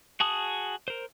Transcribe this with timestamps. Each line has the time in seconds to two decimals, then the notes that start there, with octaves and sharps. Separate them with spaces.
0.20 F#4 G#4 A5 D#6
0.88 A#4 C5